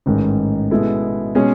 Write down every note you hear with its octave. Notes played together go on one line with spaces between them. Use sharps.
A1 G#2 D#3
B2 G#3 B3 E4 A4
B2 G#3 C#4 G#4 C#5